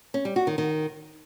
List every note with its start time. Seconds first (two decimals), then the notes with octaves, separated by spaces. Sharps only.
0.14 C#4
0.25 G3
0.36 F#4
0.47 D#3
0.58 D#3